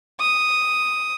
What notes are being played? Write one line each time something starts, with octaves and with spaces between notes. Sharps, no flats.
D#6